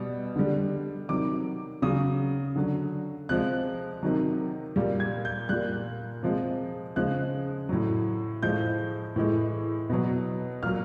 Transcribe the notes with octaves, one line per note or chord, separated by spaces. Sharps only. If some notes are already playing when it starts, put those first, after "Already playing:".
Already playing: B2 G3
D3 G3
C3 D#3 F#3 D6
C#3 F#3 D#6
D3 F#3
C3 F3 G#3 F#6
C3 D#3 F#3
A#2 G3
G#6
G6
A#2 G3 F#6
C3 F3 G#3
C#3 F3 G#3 F#6
A2 F#3
A2 F3 G#3 G6
A2 E3 G#3
B2 F#3
A#2 F#3 F6